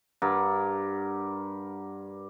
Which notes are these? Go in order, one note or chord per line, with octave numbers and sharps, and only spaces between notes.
G2 A#4 F#5